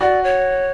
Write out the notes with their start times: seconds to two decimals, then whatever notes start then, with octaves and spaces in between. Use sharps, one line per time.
0.01 F#4 D5
0.24 C#5